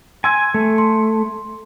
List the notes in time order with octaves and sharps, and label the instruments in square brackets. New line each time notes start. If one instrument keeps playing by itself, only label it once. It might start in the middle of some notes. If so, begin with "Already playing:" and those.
[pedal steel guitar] G#5 [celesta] C6 E6 G#6
[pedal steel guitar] A3
[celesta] C6